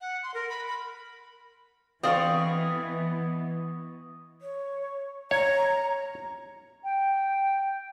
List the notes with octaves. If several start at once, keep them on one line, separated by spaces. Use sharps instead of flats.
F#5
C6
A#4
B5
B5
E3 B3 C4 D5 D#5 F5 C#6
C#5
C#5 A#5
G5